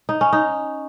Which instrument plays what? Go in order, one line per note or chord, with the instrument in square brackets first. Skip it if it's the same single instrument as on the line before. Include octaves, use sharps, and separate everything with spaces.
[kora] D#4
C#4
D#4